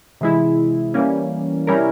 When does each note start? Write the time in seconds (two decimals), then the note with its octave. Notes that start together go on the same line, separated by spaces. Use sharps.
0.21 C3 E3 G#3 E4
0.94 E3 G3 A#3 C#4
1.67 C3 G3 C#4 E4 A#4